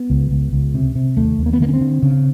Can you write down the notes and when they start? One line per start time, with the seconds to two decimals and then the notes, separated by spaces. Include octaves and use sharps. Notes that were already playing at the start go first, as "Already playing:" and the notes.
Already playing: B3
0.10 C#2
0.31 C#2
0.53 C#2
0.74 C3
0.95 C3
1.17 D#2 A3
1.38 D#2
1.46 A#3
1.53 B3
1.60 D3 A#3
1.69 C#4
1.74 C4
1.81 D3
2.03 C#3